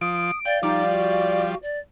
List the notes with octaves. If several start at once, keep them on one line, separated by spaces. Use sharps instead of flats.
F3 D#6 D7
D5 F5 G5
F3 G3 D#4 D5
F#4
D5